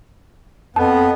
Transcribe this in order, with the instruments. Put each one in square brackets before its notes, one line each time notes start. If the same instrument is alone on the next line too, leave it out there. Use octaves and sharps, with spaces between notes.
[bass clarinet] F2 [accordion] B3 [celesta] A5